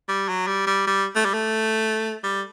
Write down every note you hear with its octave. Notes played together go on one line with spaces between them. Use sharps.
G3
F#3
G3
G3
G3
A3
G3
A3
G3